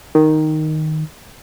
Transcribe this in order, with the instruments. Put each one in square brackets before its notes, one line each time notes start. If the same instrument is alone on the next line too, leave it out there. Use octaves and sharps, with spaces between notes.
[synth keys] D#3